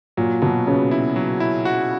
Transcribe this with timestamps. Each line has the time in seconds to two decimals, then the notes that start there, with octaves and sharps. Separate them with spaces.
0.17 A#2 F#3
0.42 B2 F#3
0.67 C#3 B3
0.91 E4
1.16 F#3
1.40 E4
1.65 F#4